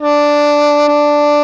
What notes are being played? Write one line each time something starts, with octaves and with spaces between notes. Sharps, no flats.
D4
D4